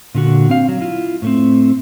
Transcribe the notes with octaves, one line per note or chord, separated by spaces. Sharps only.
A#2 D3 F#4
C4 F5
F#3
E4 F4
A2 A3 C4